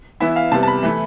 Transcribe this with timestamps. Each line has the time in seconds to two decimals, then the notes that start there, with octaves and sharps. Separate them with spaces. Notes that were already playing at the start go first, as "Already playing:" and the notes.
0.20 E3 B3 E4 E5
0.36 F5
0.52 C3 G3 B3 A5
0.63 A5
0.68 B5
0.83 E3 A3 E4